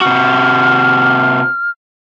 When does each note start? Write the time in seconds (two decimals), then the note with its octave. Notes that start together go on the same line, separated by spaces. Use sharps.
0.01 C3 F#4 F6